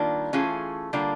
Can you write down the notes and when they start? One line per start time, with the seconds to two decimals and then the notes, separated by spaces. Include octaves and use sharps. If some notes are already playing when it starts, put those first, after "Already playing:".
Already playing: D#3 G3 A#3 D4 F4
0.33 E3 A3 C#4 F4 G#4
0.93 D3 G3 A#3 D4 F4